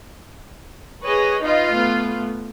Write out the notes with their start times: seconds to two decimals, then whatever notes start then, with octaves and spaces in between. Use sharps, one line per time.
1.04 G#4 B4 C#5 D#5
1.43 D#4 F4 B4 D#5
1.72 A3 B3